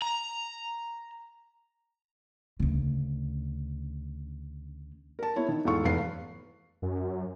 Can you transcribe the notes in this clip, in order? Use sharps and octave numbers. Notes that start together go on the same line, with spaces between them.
A#5
D2 C#3
A#4 A5
B3 E4 C#5
D#3
E2 G#2 E3 A4 F5 C#6
F1 E2 B4 F5 C7
F#2